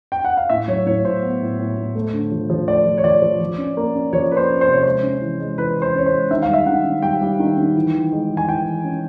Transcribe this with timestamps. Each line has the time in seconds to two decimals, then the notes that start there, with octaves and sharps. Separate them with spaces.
0.12 G5
0.24 F#5
0.37 F5
0.50 A2 E5
0.68 F#3 C#5
0.86 A2 C#5
1.04 A2 C5
1.22 B3
1.41 A2
1.59 A2
1.77 A2
1.95 A3
2.13 D3
2.32 F3
2.50 F3
2.68 A3 D5
2.86 F3
2.98 C#5
3.04 F3 D5
3.22 F3
3.40 F3
3.58 C#4
3.77 A#3
3.95 C#4
4.13 F3 C#5
4.31 A#3 B4
4.37 C5
4.50 C#4
4.61 C5
4.67 C3
4.73 C#5
4.84 G#3 C5
5.03 C#4
5.21 E3
5.40 G#3
5.58 E3 B4
5.76 E3
5.82 C5
5.95 C#4 C#5
6.06 C5
6.12 G#3
6.30 D#3 E5
6.42 F5
6.48 G3
6.53 E5
6.66 D#3 F#5
6.85 D#3
7.02 G3 G5
7.21 G3
7.39 D#3
7.57 D#3
7.75 E3
7.94 E3
8.12 G#3
8.30 E3
8.37 G#5
8.48 E3 G5
8.66 E3
8.84 C#4